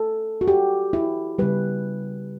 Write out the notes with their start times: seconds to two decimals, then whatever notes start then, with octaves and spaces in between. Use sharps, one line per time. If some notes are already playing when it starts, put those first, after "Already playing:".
Already playing: A4
0.41 F#4
0.48 G4
0.93 E4
1.39 C#3 G3 B4